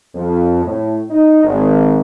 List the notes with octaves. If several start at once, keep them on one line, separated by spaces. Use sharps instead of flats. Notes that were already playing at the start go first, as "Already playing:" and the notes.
F2
A2
D#4
G#1